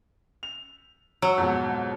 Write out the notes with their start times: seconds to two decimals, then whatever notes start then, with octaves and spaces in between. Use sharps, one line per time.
0.43 F7
1.22 F#3 E6
1.38 F2 G#2 B2